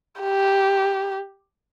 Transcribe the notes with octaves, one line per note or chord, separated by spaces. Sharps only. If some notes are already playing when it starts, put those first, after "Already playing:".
G4